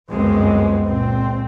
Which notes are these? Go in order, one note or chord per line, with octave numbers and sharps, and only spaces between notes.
G1 C#2 F#2 G#3 B3 C4
C#2 A#2 C4